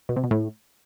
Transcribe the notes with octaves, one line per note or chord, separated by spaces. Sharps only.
B2
C3
B2
A2